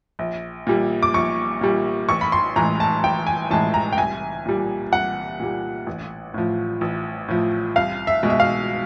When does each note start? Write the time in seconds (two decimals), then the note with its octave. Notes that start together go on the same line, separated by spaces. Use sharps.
0.19 A#1
0.67 A#2 G3
1.03 D6
1.14 A#1 C#6
1.61 A#2 G3
2.09 A1 C#6
2.21 B5
2.32 C6
2.56 A2 E3 G#3 A#5
2.80 A5
3.03 A1 G5
3.27 G#5
3.50 A2 E3 G#3 A5
3.74 A#5
3.93 G5
3.97 C2 G#5
4.46 A#2 G3
4.92 C2 F#5
5.40 A#2 G3
5.87 A1
6.34 A2 F3
6.81 A1
7.28 A2 F3
7.76 C2 F5
8.07 E5
8.23 B2 G#3
8.30 E5
8.40 F5